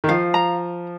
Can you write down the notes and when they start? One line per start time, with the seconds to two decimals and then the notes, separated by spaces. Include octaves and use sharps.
0.04 D#3
0.09 F3 F5
0.34 A#5